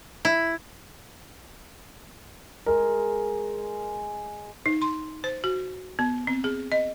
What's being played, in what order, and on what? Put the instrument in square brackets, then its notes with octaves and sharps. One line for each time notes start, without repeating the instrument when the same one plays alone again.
[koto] E4
[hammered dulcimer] G#3 [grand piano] A#4
[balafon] D#4
C6
C5
F#4
B3
C4
G#4
D#5